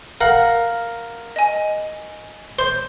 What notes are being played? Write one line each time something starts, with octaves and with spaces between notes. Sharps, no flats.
A#4 F5 F#5
D#5 G#5
C5 C6